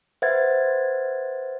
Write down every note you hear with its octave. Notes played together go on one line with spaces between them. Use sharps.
B4 C5 E5 F#5 G#6 A6